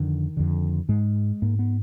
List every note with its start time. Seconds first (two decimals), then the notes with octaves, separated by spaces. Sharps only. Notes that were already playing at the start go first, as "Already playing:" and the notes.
Already playing: F2 D3 D#3
0.37 F2 D3
0.89 G#2 G#3
1.42 G#2 A#3
1.59 B3